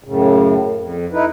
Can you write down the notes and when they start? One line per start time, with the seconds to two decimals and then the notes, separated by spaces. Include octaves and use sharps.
0.04 F#2 A2 C#3
0.77 F2
1.12 D#4 E4 B4